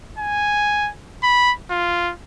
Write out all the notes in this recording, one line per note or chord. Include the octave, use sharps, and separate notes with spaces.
G#5
B5
F4